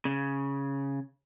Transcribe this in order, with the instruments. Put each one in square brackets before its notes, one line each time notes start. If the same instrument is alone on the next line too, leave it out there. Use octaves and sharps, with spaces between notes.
[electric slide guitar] C#3